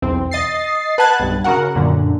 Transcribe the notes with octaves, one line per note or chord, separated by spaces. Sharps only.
B1 E2 C4
D#5 A6 C7
B4 F#5 A5 F#6 G#6 A6
B1 G2
C#3 F#4 A#4 F#5
F#2 A#2 D3